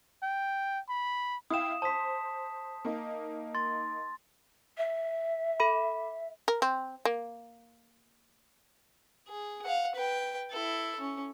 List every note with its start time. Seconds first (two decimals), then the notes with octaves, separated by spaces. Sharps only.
0.23 G5
0.89 B5
1.50 E4 F5 G5 D#6 E7
1.82 C5 A5 C6 D#6 B6
2.85 A#3 D#4
3.55 C6 A6
4.77 E5
5.60 A4 B5
6.48 A#4
6.62 C4
7.05 A#3
9.28 G#4
9.64 F5 F#5
9.96 B4 G5
10.51 E4 A4
11.00 C#4